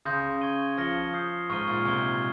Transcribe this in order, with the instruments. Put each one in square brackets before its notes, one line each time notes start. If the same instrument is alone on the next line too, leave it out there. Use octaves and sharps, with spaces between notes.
[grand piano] C#3 [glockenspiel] C6 D#6 G6 A#6
[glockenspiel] C#6 G#6 D#7 G7
[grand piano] F3 [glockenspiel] F6 A#6 C#7 G7
[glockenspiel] D#6 G6 C7
[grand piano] G#2 [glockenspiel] C#6 F6 C7 D#7 G7
[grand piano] A#2
[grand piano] C3 [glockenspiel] C#6 G#6 C7 G7